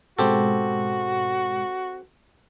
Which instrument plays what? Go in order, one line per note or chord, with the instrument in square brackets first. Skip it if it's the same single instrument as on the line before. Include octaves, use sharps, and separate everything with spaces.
[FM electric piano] G#2 B2 G#3 [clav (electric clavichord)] C4 G4 A4 [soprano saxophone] F#4